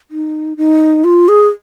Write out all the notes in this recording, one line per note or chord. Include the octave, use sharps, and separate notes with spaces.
D#4
D#4
F4
G#4